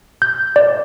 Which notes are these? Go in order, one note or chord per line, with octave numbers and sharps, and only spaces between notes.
G6
D5